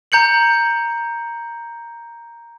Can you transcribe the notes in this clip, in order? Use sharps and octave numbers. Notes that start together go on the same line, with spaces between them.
A#5 G6 C#7 F#7